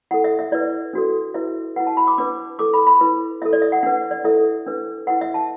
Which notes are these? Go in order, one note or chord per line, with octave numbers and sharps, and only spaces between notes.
E4 A4 F#5
E5
E5
E4 B4 D5
D4 F#4 A4
E4 B4 E5
E4 B4 F#5
A5
B5
D6
D4 B4 D6
E4 A4 D6
B5
B5
E4 B4
E4 A4 E5
D5
E5
F#5
D4 B4 F#5
D5
E4 A4 E5
D4 B4
E4 B4 F#5
E5
A5